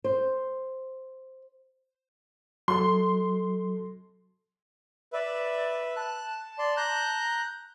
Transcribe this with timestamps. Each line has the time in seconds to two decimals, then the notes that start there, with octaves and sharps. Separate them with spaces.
0.04 C5
2.68 F#3 A4 C6
5.13 B4 D5 E5
5.96 A5 F#6
6.59 D5 C6
6.77 A#5 F#6 G6